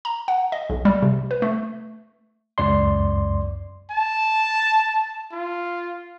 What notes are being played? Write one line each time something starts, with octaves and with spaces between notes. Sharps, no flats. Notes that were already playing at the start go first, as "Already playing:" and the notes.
A#5
F#5
D#5
B1
G3
C3
B4
A3
C#2 F#2 D5 C6
A5
F4